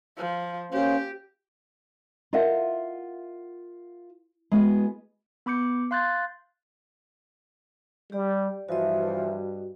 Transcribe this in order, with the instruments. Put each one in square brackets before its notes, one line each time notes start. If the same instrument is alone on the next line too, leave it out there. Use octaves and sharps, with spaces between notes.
[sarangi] F3
[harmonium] A#3 C#4 C5 [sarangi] G4
[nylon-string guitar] F4 A#4 D#5 E5 F#5
G#3 B3 F#4 G#4
[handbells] B3 B5 D6 G6 C#7
F5 C6 F#6 G6 A6
[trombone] G3 [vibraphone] G4 D5
[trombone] G2 [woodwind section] E3 F3 [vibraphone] F#4 D#5